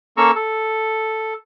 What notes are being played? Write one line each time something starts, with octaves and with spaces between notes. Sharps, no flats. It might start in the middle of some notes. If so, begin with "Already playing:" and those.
A#3 C#4 A4 A#5 C#6 E6
A4